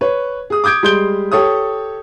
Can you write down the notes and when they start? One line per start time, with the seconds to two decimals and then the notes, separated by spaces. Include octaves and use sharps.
0.01 B4 C#5
0.50 G#4 D#6
0.64 D6 D#6 G6 G#6 D7
0.83 G3 G#3 C6 G6 D7 G7
1.32 G4 A4 C#5 D#6